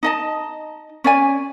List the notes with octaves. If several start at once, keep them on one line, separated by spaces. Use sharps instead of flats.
D#4 D#5 A5
C#4 D5 G#5